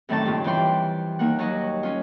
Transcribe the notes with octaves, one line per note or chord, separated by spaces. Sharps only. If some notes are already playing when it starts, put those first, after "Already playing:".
F#2 A2 D#3 C4 D5 A5
G2 A#2 C#3 F4
F2 E3 G3 B4 G5 C6
D#2 A#3 D#4 F#5
F#3 G3 D#4 F#4 D#5
C#4 F4